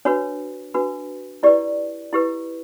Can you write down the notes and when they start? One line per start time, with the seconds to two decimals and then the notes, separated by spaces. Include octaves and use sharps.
0.05 D4 F#4 B4 C#5
0.74 D4 F#4 B4
1.43 E4 G4 B4 D5
2.13 E4 G4 B4